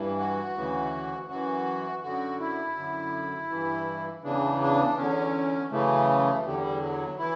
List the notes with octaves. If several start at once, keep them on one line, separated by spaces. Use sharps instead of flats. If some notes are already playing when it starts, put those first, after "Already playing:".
Already playing: G2 E3
F#4
D2 C#3 E3
F#2 E3 F#4
F#2 D3 F#4
E4
F#2 D3
G2 E3
E2 C#3 E3 D4
D4
E2 D3 C#4
F#2 C#3 E3 A3
E2 D3 G3
F#3
E3 E4